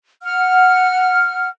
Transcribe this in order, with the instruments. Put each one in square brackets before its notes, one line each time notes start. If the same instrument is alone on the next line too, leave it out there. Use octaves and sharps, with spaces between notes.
[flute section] F#5 F6